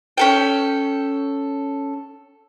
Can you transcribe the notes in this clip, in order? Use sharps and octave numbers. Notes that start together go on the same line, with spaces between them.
C#4 A4 G5